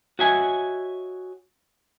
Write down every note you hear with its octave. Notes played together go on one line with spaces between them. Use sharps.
F#4 C#5 D#5 E5 F#5 G#5